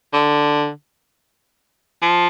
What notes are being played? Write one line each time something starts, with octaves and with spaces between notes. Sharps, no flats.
D3
F3